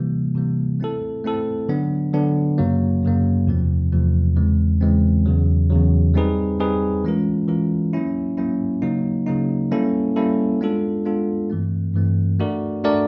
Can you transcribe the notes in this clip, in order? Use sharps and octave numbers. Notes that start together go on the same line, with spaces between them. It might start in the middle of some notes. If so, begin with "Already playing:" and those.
Already playing: C3 E3 G3 A#3
C3 E3 G3 A#3
A3 C4 E4 A4
A3 C4 E4 A4
D3 F#3 B3 D4
D3 F#3 B3 D4
F#2 C#3 F#3 A#3
F#2 C#3 F#3 A#3
E2 C3 F3 A3 C4
E2 C3 F3 A3 C4
E2 C#3 E3 G#3 C4
E2 C#3 E3 G#3 C4
E2 C#3 F#3
E2 C#3 F#3
G3 C4 D#4 G#4 B4
G3 C4 D#4 G#4 B4
E3 G#3 C#4 F4 A#4
E3 G#3 C#4 F4 A#4
F#3 A#3 C#4 E4
F#3 A#3 C#4 E4
C#3 F#3 A#3 D#4
C#3 F#3 A#3 D#4
G3 A#3 C#4 E4 A4
G3 A#3 C#4 E4 A4
G#3 B3 D4 F4 A4
G#3 B3 D4 F4 A4
G2 E3 A3 C4
G2 E3 A3 C4
A3 D4 F#4 A#4 D5
A3 D4 F#4 A#4 D5